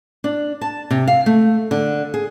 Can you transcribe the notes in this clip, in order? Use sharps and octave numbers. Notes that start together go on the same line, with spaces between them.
D4
A5
C3
F5
A3
D3
G#4